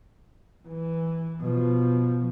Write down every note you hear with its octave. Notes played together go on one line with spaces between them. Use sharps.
E3
B2 F3